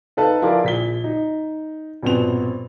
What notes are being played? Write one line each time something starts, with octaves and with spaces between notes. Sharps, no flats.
D#4 A4 B4 F5 A5
F3 E4 F4 G#4 A#4 D5
A#1 B6 G7
D#4
A#1 G2 B2 B3 C4 F7